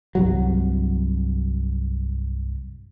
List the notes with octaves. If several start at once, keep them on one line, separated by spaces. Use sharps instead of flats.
C2 G2 F#3